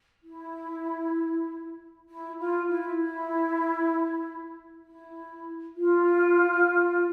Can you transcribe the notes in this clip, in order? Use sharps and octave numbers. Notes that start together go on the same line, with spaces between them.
E4
E4
F4
E4
E4
E4
F4